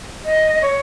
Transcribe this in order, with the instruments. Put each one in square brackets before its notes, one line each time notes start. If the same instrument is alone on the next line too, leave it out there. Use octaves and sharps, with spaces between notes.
[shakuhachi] D#5
C#5